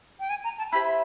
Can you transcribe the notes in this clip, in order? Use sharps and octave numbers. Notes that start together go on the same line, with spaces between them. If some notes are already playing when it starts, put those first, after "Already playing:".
G5
G#5
A#5
A5
E4 G4 C5 E5 B5